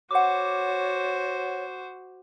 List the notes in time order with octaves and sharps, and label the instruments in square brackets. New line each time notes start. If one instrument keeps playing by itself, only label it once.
[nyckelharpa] F#4 C5 [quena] C#5 [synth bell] F#5 D6